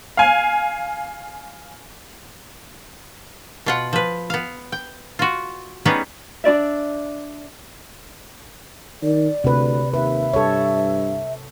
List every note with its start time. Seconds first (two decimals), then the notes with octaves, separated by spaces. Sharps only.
0.17 F5 G#5
3.66 B2 F4 F#5
3.93 F3 B4
4.30 B3 F5
4.72 G5
5.19 F4 F#4
5.85 G3 B3 C#4 D#4 G#4 B4
6.44 D4 F4 D5 E5
9.02 D#3 D5
9.44 D2 C3 B4
9.94 D#2 B4 E5
10.33 G2 A4 C#5